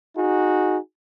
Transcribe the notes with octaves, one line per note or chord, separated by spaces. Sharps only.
D#4 F#4 G#4